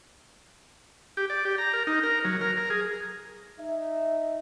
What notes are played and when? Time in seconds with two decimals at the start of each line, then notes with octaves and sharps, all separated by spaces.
1.17 G4
1.30 D5
1.45 G4
1.58 A#5
1.73 A#4
1.87 D#4
2.03 A#4
2.25 F#3
2.41 A#4
2.57 A#4
2.70 G#4
3.59 D#4 E5